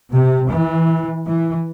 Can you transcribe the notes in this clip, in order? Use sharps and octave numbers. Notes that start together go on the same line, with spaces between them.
C3
E3
E3